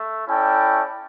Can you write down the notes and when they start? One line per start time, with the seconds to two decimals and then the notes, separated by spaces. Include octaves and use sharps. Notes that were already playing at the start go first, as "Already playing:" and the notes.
Already playing: A3
0.26 C#4 E4 A4 D5 G5